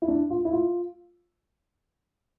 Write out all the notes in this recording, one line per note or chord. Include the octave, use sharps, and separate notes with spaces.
E4
D4
F4
E4
F4